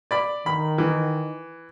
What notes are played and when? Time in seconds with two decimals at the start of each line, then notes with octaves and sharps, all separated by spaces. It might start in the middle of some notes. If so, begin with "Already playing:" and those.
0.11 D5 B5
0.46 D#3 B5
0.78 E3